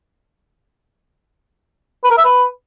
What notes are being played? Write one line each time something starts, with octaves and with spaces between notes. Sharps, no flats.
B4
A#4
E5
B4